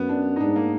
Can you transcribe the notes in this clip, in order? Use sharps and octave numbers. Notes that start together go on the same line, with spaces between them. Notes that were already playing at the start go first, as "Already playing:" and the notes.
Already playing: F#2 B3
D4
D#4
G#2 D4
A#3